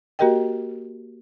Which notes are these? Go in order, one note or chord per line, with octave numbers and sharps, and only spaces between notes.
A#3 F#4 G4 A#4 D#5 G5